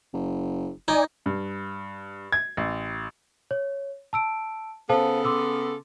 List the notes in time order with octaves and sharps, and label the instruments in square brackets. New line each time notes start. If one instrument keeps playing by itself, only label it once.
[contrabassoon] F#1
[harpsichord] D#4 [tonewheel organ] D5 G#5
[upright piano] G2
G#6
A1
[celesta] C#5
A5 E6 D7
[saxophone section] C#3 B3 A4 [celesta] C5 F5 A5
[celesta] C6 D6 E6